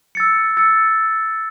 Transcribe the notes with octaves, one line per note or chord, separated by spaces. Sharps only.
E6 A6 C#7
E6 A6 C#7